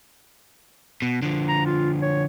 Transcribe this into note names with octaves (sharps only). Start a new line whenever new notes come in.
B2
D3 F3
A#5
F4
C#5